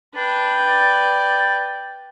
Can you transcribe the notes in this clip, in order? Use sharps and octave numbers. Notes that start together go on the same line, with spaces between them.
D4 B4 G5
D5